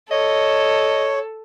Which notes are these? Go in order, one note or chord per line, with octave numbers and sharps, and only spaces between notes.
A4 C#5 D#5